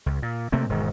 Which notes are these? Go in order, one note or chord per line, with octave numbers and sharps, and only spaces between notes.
C#2
A#2
C3 A3 A#3 C4
E1 G#2 D#3